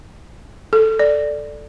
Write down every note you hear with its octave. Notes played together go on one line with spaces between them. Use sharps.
A4
D5